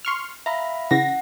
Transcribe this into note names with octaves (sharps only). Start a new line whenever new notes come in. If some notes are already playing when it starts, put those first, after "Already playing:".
C6 C#6 F6
E5 F5 A#5 B5
C#3 E3 F#5 A#6